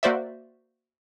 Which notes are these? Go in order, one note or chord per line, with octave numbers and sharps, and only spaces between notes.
A#3 F#4 C5 D5 E5